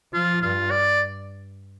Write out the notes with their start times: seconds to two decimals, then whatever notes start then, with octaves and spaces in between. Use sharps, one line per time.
0.13 F3 F4
0.42 G2 F4
0.71 D5